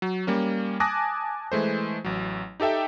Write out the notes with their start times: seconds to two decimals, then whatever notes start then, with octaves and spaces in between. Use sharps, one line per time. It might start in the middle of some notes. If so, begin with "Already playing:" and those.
0.02 F#3
0.27 G3 A#3 C#4
0.80 G#5 A5 D6 D#6 F#6 A#6
1.52 E3 G#3 A3 C5
2.04 A1 F#3
2.60 D#4 G4 A4 E5 G5